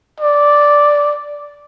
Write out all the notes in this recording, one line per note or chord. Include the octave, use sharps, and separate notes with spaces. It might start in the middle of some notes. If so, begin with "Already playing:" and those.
D5